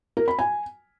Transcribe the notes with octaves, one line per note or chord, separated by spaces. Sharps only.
A#4
B5
G#5